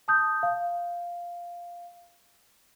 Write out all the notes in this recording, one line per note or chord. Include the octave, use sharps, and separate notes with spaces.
A5 D#6 G6
F5